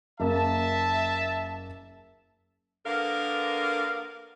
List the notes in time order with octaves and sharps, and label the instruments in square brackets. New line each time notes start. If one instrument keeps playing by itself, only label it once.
[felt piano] F#1 A#3 [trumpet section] E5 A5
[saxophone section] D3 A#3 B3 A#4 F5